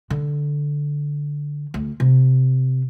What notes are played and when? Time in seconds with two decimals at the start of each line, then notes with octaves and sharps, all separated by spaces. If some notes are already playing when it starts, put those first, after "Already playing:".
0.10 D3
1.74 D2
2.00 C3